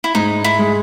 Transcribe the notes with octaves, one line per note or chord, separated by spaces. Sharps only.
E4
G#2 D#4
E4
G#3